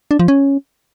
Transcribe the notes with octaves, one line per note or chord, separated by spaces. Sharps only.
D4
F3
C#4